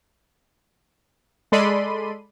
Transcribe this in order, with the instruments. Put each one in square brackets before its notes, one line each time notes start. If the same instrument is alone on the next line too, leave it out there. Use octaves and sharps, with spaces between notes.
[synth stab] G#3 A4 D5 B5 C6 D#7